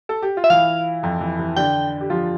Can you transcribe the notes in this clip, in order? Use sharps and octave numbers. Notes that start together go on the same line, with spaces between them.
A4
G4
F4
E5
E3 E4 F5
F2 F3
E3
E3
D3 D4 G5
G4
F3 F4